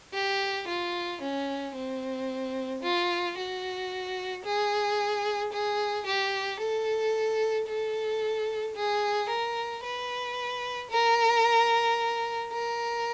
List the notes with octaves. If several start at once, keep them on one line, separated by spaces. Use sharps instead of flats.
G4
F4
C#4
C4
F4
F#4
G#4
G#4
G4
A4
A4
G#4
A#4
B4
A#4
A#4